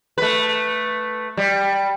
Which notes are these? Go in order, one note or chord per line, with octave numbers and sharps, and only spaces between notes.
A3 B4
G3